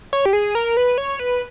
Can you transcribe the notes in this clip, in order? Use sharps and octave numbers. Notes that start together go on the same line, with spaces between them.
C#5
G4
G#4
A#4
B4
C#5
B4